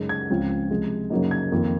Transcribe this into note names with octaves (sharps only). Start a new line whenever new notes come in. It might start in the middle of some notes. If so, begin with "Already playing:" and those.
Already playing: F#2 C#3 G#3 D#4
G#6
C#2 C#3 F3 C4 F4
C3 F3 G#3
F#2 C#3 F#3 A#3 D#4
G#6
F2 D#3 A#3 F4